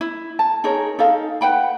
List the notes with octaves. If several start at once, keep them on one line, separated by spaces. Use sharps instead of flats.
E4
A5
D#4 G#4 A#4 C#5
D#4 A4 F5
B4 F#5 G5 B5